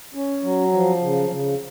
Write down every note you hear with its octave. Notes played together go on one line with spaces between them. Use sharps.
C#4
F#3
F3
C#3
C#3